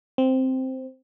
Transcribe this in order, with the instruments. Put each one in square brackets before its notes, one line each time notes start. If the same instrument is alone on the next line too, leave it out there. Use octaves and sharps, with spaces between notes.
[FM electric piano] C4